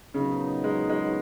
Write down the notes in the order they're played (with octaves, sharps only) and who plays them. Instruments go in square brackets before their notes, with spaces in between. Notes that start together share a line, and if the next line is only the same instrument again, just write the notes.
[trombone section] A#2 F#3 B3 D#4 [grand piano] C#3
[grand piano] G#3
G#3